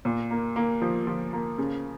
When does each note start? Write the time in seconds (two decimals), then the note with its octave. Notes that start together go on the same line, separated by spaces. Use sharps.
0.05 A#2
0.31 A#3
0.56 A#3
0.82 F3
1.07 F3
1.33 A#3
1.58 C#3